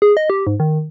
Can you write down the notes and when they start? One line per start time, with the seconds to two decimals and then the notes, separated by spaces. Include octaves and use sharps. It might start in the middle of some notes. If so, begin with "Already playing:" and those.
0.02 G#4
0.17 D#5
0.30 G4
0.47 G#2
0.60 D#3